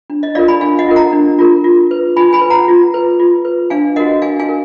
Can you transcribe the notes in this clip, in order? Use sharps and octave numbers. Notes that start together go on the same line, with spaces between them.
D4
D#5
F4 A#4 D5 F5
G#5 B5
D4 F5 G#5
D#5 F#5
F4 A#4
F#5 A#5
D4
F4 A#4
F4
B4
F4 G#5 B5
G#5 B5
B4
F#5 A#5
F4
B4
F4
B4
D4 F5 G#5
F#4 A#4 D#5 F#5
D4 F5 G#5
F5 G#5
A#4